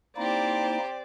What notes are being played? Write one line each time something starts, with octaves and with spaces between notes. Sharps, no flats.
A#3 C4 D#4 E4 G4 C5 D5